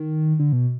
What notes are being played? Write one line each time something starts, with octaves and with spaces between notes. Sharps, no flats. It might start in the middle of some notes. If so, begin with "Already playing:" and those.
Already playing: D#3
D3
B2